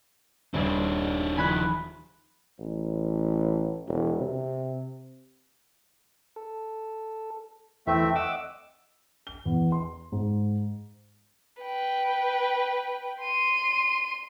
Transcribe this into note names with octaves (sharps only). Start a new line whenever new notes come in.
D#1 C4 D4 G#4 E5
D#3 F3 G#5 B5 F#6
A1
E1
C3
A4
E2 E3 A3 C4 E4 E5
D#5 F#5 D6 E6
G7
E2
C6
G#2
B4 G5
C6 D#7